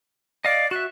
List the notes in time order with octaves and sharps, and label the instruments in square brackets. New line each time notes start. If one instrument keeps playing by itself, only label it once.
[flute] D5 [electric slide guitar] D#5 F5
[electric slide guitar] F#4 E5 [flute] F#6